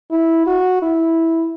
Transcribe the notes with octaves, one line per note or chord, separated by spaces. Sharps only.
E4
F#4
E4